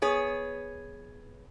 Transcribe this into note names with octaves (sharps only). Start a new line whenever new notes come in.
B3 G#4 C#5